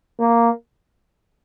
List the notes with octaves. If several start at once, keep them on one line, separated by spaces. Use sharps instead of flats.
A#3